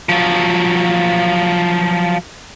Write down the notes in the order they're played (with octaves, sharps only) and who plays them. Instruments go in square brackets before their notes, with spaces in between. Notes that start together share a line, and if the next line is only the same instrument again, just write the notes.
[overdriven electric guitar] F3 F#3